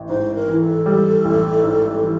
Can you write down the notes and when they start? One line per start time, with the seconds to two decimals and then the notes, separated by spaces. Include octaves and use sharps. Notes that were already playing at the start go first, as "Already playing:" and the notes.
Already playing: A1
0.09 G#2 C5
0.35 A#4
0.48 E3
0.60 A4
0.86 G3
1.25 A1
1.64 G#2
2.02 E3